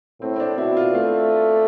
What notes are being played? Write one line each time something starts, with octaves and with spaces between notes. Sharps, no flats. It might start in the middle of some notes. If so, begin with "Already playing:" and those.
A2 C4
C4
D4
B2 E4
F4
A3 F4